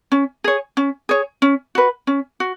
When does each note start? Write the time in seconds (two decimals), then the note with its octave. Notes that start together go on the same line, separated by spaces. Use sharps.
0.12 C#4
0.44 G#4 C#5
0.77 C#4
1.09 G#4 C#5
1.42 C#4
1.75 F#4 B4
2.07 C#4
2.40 F#4